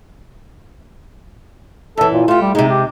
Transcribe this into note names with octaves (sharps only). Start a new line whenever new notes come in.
F#2 E3 A4
A#2
A3 F4 G4
G3
C3 G#3 D#4
G4